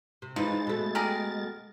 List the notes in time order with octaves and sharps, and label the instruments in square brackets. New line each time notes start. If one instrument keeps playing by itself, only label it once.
[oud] C3
[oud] E3 D#4 [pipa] F3 [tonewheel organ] G#3 A6
[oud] B2 A3
[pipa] G4 G#4 A#4